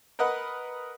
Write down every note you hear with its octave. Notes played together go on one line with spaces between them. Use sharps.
A#4 B4 D#5 F#5